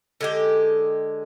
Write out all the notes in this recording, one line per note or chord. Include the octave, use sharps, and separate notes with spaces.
D3 G#3 G4